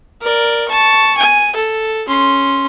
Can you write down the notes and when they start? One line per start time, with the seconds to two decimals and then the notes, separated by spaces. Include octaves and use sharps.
0.21 A#4 D5
0.68 A5 C#6
1.17 G#5
1.55 A4
2.08 C#4 C6